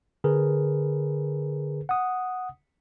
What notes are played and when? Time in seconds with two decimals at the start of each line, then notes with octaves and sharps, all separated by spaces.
0.24 D3 G#4 A#4 B4
1.89 F#5 D#6